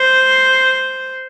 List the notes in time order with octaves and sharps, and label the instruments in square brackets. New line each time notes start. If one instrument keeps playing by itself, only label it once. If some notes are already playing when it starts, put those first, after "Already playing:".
Already playing: [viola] C5